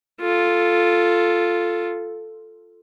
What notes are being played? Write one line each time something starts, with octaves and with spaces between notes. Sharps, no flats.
F4 A4